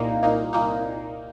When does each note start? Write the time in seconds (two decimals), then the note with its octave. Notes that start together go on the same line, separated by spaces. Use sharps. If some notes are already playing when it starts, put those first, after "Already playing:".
Already playing: C2 A#2 A#3 D#4
0.22 C2 A#2 A#3 D#4
0.53 C2 A#2 A#3 D#4